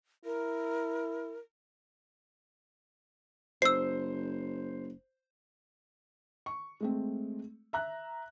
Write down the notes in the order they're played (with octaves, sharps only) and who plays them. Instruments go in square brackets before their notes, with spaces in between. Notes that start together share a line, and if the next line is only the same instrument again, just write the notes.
[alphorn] E4 [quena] A#4
[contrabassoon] F#1 [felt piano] C5 [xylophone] E6 C7
[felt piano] C#6
G#3 A3 C4
E5 A#5 F#6